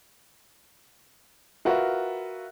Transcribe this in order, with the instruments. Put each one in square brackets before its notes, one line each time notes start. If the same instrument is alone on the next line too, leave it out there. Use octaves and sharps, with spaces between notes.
[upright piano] F4 F#4 A#4 B4 E5